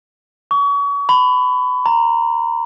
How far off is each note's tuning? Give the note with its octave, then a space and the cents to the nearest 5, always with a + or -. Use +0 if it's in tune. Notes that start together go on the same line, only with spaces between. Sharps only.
C#6 +35
B5 +25
A#5 -10